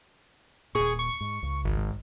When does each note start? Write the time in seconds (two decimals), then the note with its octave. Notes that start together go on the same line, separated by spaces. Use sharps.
0.75 D#1 A#2 G#4 C#6
0.99 C#6
1.21 G#2
1.42 C#2
1.64 G#1
1.77 G#2